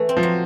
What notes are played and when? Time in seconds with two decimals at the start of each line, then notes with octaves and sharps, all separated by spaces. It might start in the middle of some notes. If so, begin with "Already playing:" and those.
Already playing: E3 A3
0.09 C4
0.17 F3
0.23 F#3